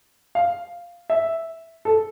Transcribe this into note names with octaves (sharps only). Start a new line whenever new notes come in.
F5
E5
A4